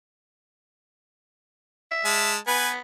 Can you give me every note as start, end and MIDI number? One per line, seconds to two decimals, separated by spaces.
1.91 2.31 76
2.05 2.37 56
2.05 2.37 81
2.47 2.78 59
2.47 2.69 71
2.47 2.69 80